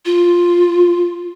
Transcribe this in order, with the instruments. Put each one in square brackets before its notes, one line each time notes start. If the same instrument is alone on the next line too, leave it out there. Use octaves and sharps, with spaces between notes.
[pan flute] F4